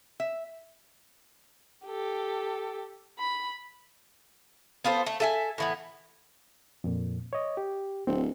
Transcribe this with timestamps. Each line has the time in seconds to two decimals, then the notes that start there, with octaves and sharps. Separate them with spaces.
0.20 E5
1.86 G4 A4
3.19 B5
4.84 B3 F4 A4 C5
5.06 A3
5.20 A4 E5 G#5
5.58 A2 E3 B3
6.84 F2 A#2
7.33 C#5 D#5
7.57 G4
8.07 D1 C4